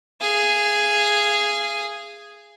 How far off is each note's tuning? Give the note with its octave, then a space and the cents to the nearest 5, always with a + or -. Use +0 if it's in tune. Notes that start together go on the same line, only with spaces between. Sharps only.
G#4 +0 F5 -30